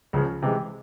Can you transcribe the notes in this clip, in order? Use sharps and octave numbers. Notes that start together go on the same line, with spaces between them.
C#2 C#3 F3
C3 E3 G#3